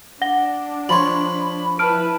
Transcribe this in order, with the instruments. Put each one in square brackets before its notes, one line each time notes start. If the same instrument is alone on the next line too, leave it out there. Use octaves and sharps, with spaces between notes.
[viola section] D4 [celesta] F#5 A#6 G7
[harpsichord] F3 C#5 [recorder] B5 [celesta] C6 F#7
[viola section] E4 B4 [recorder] A5 [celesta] F6 D7